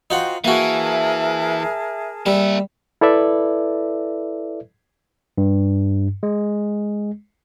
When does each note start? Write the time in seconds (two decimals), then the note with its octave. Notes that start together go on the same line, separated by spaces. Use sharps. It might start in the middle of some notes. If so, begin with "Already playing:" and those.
0.10 D#4 F4 F#4 C5 F#5 G5
0.44 E3 A#3 F#4 G#4 A#4 E5 A5
2.26 G3 A#3 E5
3.01 E4 A4 B4 D5 E5
5.38 G2
6.23 G#3